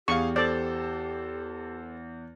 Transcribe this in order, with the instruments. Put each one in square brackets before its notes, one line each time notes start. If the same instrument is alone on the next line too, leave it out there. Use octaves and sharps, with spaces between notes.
[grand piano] E2 [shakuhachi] G4 [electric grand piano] G#4 F5 [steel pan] C#6
[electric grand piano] A4 C5 [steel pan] D5